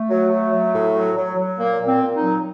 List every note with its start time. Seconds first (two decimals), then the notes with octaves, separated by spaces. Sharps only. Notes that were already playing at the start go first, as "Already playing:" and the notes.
Already playing: A3
0.09 F#3
0.30 F#3
0.51 F#3
0.73 A2
0.95 F#3
1.17 F#3
1.37 F#3
1.58 A#2 A#3
1.80 A#2
1.87 C4
2.01 A#2
2.16 D#4
2.22 F#3